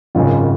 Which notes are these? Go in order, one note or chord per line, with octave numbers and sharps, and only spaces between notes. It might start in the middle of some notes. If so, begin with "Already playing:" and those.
G#1 F#2 C#3 G#3 F4